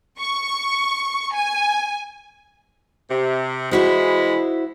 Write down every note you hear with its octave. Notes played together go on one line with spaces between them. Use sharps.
C#6
G#5
C3
E3 G#3 E4 F#4 C5 B5